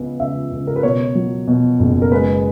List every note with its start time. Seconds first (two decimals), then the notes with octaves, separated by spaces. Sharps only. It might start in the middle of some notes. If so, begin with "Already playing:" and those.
Already playing: C#2 B3
0.20 C#2 E5
0.52 C#2
0.67 A#4
0.76 B4
0.83 B2 C#5
1.15 F#3
1.47 B2
1.80 F#1
2.02 A#4
2.12 G#3 B4